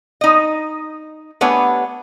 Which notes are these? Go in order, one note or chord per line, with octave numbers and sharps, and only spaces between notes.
D#4 D#5
A3 B3 D4 G4 C#5 G#5